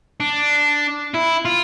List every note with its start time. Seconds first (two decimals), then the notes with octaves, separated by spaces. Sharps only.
0.20 D4
1.14 E4
1.45 F4